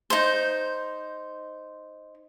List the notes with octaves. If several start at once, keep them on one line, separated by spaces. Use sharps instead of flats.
D#4 C5